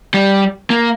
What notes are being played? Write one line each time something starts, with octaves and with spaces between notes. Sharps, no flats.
G3
A#3